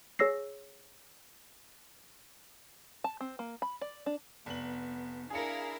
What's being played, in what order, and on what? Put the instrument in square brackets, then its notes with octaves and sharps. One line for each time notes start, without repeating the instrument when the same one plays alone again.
[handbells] G#4 C#5 E6 A#6 C7
[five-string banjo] A5
C4
A#3
B5
D5
D4
[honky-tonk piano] F1 F#7 [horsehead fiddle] B3
[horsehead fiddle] D4 [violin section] E4 A#4 F5 [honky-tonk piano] G#4 C#7